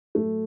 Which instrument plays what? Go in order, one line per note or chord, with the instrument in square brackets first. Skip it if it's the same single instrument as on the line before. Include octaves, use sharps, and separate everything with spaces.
[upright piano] A2 F#3 A3